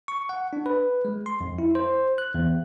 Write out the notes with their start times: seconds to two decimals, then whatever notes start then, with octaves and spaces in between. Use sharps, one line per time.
0.08 C#6
0.29 F#5
0.53 D4
0.66 B4
1.05 G#3
1.26 C6
1.41 F2
1.58 E4
1.75 C5
2.18 F#6
2.35 E2